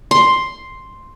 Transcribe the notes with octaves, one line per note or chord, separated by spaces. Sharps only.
C6